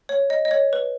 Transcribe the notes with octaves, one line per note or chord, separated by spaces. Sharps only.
C#5
D#5
D#5
C#5
B4